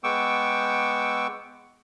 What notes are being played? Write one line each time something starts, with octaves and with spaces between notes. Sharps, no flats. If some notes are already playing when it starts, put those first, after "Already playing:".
G#3 B3 G5 C#6 D6 E6